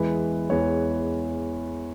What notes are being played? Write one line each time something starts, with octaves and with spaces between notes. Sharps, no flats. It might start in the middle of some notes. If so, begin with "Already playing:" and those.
Already playing: E2 E3 G#3 B4
E2 E3 G#3 C#5